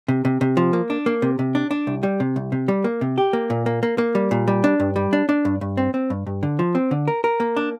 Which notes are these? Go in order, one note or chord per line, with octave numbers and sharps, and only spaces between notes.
C3
C3
C3
F3
A#3
D4
A#3
C3
C3
D4
D4
C2
G3
C3
C2
C3
G3
A#3
C3
G4
A#3
A#2
A#3
A#3
A#3
G3
A#2
G3
D4
G2
G3
D4
D4
G2
G2
C4
C4
G2
G2
D3
F3
C4
D3
A#4
A#4
A#3
D4